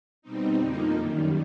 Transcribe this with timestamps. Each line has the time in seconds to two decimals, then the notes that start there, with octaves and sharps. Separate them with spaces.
0.22 B2 G3 C4 D#4
0.58 F2 D3 F3 A#3 D#4
0.95 F#2 D#3 G3